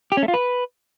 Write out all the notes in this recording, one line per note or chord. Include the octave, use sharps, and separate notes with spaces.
G4
C#4
A3
F4
B4